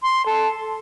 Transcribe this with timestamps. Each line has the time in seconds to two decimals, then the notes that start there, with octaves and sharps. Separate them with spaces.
0.03 C6
0.26 A4